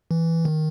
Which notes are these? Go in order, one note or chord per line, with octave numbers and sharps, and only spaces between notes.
E3
D#3